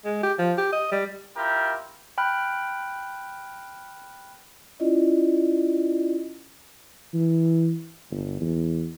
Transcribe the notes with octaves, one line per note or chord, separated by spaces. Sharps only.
G#3
G4
F3
G4
D#5
G3
E4 F4 G4 A#4
G5 B5 F6 F#6
C#4 E4 F4 D5 D#5
E3
G1
E2